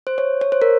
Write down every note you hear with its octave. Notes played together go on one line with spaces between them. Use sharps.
C5
C#5
C#5
C5
A#4